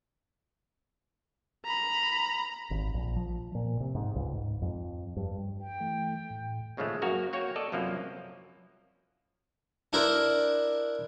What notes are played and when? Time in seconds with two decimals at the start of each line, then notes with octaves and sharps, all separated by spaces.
1.65 A#5 B5
2.71 G#1
2.94 A#1
3.16 F3
3.55 A#2
3.80 C3
3.95 G#2
4.16 C#2
4.33 G#2
4.62 F2
5.16 G2
5.60 G5
5.80 E3 A3
6.30 A2
6.77 D#2 C#3 F3 G#3 A3
7.02 F#2 A#3 F#4 A#5
7.33 A#3 F#4 C#5 G5
7.56 A4 D5 D#5
7.72 C2 F#2 F3 F#3 A#3
9.93 D4 E4 A#4 C5